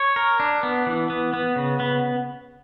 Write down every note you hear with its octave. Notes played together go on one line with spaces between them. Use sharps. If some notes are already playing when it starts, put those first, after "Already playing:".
Already playing: C#5
A#4
D4
B3
E3
B3
B3
C#3
B3